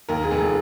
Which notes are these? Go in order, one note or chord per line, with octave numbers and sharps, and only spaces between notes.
D#2 A#4
G#4
F1
G#4